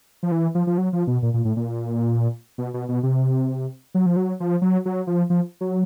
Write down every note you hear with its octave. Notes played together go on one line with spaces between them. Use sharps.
F3
E3
F3
F3
F#3
F3
B2
A#2
A#2
A2
A#2
B2
B2
B2
C3
F#3
F3
F#3
F3
F#3
F#3
F3
F3
F#3